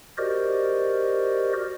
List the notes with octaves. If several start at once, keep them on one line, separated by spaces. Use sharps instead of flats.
F#4 G4 A#4 C5 D5 D#5